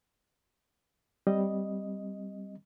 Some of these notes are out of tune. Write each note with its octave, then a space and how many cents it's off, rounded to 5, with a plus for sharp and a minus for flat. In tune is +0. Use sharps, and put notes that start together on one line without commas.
G3 +0 C4 +0 D#5 +0